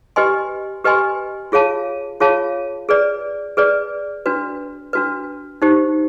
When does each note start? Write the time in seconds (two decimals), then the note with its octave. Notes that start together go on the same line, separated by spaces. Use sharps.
0.16 G4 B4 D#5 G#5 C6
0.84 G4 B4 D#5 G#5 C6
1.52 F4 G#4 C#5 F5 A5
2.20 F4 G#4 C#5 F5 A5
2.89 G#4 B4 D5
3.57 G#4 B4 D5
4.26 D4 F#4 B4
4.93 D4 F#4 B4
5.62 D#4 G4 C5